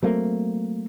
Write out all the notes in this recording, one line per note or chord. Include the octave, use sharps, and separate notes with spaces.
F#3 A3 A#3 C4